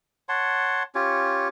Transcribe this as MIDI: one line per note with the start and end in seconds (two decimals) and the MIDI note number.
0.29 0.83 73
0.29 0.83 78
0.29 0.83 81
0.29 0.83 84
0.95 1.48 61
0.95 1.48 65
0.95 1.48 67
0.95 1.48 73